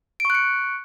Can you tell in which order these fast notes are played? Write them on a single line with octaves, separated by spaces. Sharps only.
D7 C#6 F#6 C#7